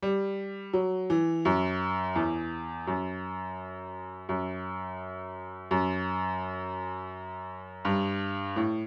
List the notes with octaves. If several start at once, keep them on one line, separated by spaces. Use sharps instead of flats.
G3
F#3
E3
F#2
E2
F#2
F#2
F#2
G2
A2